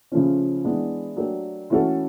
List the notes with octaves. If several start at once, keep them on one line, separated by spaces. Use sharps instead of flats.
C#3 F3 A3 C#4
E3 G#3 B3 D4
F#3 A3 D4 G4 A#4
E3 A3 C#4 F#4 A4